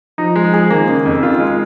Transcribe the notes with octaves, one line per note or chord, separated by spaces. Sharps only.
F3 D#4
G#3
G#4
D#3 A#3
C#3
F2
D#3 F4
G#3